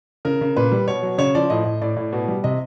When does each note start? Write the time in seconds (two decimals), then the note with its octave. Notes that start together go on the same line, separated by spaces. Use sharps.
0.25 C#3 A#4
0.41 C#3
0.56 A#2 B4
0.72 G3
0.88 B2 C#5
1.03 F#3
1.18 C#3 C#5
1.35 F3 D5
1.50 A2 D#5
1.65 A2
1.82 A2 D5
1.97 A2
2.13 B2
2.28 G3
2.44 C3 D#5